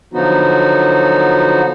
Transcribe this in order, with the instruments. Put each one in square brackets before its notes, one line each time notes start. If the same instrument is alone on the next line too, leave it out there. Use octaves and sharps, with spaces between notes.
[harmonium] D3 F3 F#3 B3 D#4 F#4